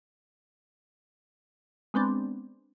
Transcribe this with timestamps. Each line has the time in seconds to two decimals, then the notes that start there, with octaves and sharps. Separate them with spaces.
1.94 G#3 B3 C4 D4